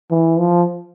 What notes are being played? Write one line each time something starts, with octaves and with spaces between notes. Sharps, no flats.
E3
F3